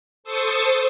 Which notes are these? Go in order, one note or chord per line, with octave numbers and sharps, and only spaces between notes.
A4 C5 C#6 D#6 E6 A6